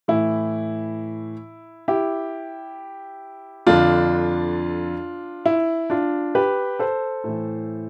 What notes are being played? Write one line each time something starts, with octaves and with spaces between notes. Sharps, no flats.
A2 E3 E4
E4 G4
F2 D3 D4 F4
E4
D4 F4
G4 B4
A4 C5
A2 E3